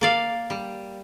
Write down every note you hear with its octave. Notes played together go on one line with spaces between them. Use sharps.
A#3 D5 F5
G3